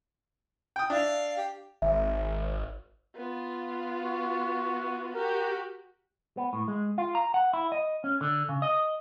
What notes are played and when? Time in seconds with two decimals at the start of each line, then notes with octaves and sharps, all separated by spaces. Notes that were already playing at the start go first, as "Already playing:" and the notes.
0.76 G5 D#6
0.90 D4 E5 F5
1.37 G4
1.82 G#1 E5
3.16 B3 F4
4.04 F#4
5.14 F#4 G4 A#4
6.37 B3
6.53 A2
6.68 G#3
6.98 F4
7.15 A#5
7.34 F#5
7.53 E4
7.72 D#5
8.04 C#4
8.21 D3
8.49 C#3
8.62 D#5